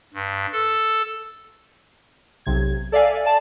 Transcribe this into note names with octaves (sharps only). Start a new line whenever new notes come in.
G2
A4
B1 C3 G#6
A4 D5 E5 F5 G#5
D5 A5